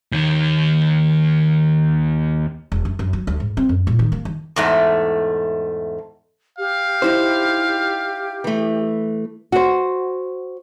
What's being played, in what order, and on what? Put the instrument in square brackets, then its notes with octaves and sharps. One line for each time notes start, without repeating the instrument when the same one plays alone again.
[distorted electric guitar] D#2 D#3
[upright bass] E1
F#2
F#2
F#3
D2
G#2
C4
F#2
A#2
D#3
A#3
D#3
[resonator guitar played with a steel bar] E2 G#2 A3
[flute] G4 [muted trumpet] F5
[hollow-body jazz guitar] D#4 E4 C5
[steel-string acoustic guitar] E3 A3
[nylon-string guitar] F#4 C5